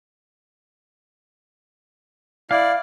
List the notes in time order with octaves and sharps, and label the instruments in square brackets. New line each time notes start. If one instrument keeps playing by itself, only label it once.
[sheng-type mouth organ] E4 D5 [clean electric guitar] F5